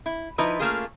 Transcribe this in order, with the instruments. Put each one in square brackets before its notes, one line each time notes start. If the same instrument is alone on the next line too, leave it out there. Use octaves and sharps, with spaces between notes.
[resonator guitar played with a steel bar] E4
F3 D#4 E4 B4 D#5
A3 A#3 C#4 F4 G#4